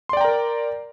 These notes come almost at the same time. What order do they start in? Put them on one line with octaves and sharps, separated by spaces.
C6 D5 G5 A#5 A#4